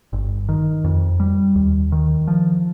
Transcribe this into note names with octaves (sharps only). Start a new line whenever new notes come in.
G1
D#3
F2
G3
D#2
D#3
F3